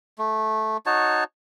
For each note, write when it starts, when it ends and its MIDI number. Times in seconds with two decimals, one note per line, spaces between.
0.19 0.77 57
0.86 1.24 63
0.86 1.24 66
0.86 1.24 73
0.86 1.24 81